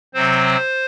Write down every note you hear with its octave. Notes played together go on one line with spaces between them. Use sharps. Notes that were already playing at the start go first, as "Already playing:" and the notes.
C3 F#3 C4 C5